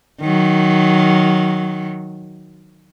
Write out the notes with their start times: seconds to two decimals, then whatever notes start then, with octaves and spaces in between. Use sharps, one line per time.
0.21 D#3 F#3